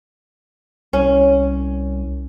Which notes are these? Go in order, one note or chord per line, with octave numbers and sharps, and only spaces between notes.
C2 C#4